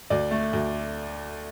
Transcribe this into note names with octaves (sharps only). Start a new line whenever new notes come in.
D2 D5
A3
D2